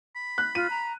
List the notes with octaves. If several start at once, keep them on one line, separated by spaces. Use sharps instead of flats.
B5
F#6
F4 D#7
A#5